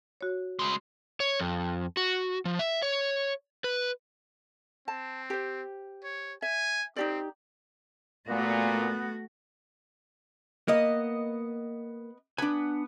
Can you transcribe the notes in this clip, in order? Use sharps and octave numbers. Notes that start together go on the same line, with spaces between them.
F#4 C#5
C#3 G#3
C#5
F2
F#4
F3
E5
C#5
B4
C4 A5
G4 C5
C#5
E5 G#5
C4 D#4 G4 D5
A#2 A3 B3 F#4
A#3 B3 D#5
B3 D4 G#5